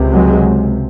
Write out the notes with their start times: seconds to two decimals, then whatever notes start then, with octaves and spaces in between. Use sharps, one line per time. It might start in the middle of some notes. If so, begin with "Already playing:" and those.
Already playing: C#2 C3
0.13 F#3 G#3